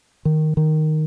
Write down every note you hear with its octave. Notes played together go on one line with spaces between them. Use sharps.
D#3
D#3